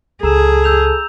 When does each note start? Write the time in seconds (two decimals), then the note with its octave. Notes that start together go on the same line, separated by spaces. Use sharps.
0.23 C#2 G#4 A4 A#5 E6 E7
0.64 E6 G6 F7